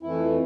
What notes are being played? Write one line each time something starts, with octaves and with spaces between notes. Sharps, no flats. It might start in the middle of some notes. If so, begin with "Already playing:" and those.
F2 E3 A3 E4